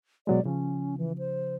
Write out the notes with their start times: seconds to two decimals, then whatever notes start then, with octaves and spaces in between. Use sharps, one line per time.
0.27 B2 F#3 G#3 D5
0.45 C#3 F3 C#4
0.98 E3
1.18 C5